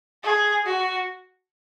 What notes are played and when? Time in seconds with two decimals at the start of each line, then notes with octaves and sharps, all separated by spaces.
0.24 G#4
0.66 F#4